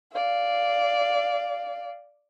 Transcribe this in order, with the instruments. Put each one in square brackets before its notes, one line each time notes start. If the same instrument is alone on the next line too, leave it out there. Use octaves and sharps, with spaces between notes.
[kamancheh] D5 F5